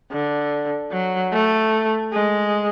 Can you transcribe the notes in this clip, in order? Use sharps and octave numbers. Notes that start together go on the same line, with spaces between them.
D3
F#3
A3
G#3